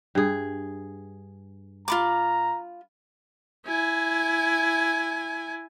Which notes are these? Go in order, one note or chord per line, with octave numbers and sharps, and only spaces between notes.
G2 G#4
F4 A#5 B5 D6
E4 G#5